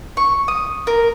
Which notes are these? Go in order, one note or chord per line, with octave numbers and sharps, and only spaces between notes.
C#6
D#6
A#4